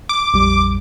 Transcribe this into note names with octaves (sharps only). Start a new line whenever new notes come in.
D6
A#1 F2 G3